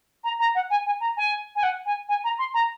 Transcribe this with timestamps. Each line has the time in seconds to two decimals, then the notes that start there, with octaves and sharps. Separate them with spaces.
0.24 A#5
0.40 A#5
0.55 F#5
0.70 G#5
0.86 G#5
1.01 A#5
1.17 G#5
1.56 G#5
1.63 F#5
1.86 G#5
2.09 G#5
2.24 A#5
2.39 C6
2.54 A#5